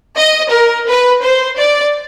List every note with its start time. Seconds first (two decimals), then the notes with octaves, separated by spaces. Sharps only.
0.15 D#5
0.51 A#4
0.86 B4
1.22 C5
1.57 D5